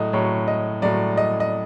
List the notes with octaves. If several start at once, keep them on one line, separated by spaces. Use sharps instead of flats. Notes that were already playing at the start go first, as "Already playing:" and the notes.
Already playing: A2 F#3 D#5
A2 F#3 C#5
D#5
A2 F#3 D5
D#5
D#5